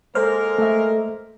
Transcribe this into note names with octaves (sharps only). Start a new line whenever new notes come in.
G#3 A#3 A4 A#4 C5 F6
A3 E5